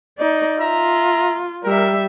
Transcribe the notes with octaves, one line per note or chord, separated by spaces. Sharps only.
D#4 D5
F4 E5 A#5
G3 A#4 E5